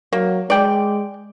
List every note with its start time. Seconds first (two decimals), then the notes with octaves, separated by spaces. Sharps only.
0.13 F#3 A#3
0.50 G#3 D5 G5